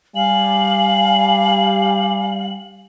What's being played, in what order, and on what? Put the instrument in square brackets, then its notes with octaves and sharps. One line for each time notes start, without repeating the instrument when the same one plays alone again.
[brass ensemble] G3 [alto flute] F5 [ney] G#5 [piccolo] F#7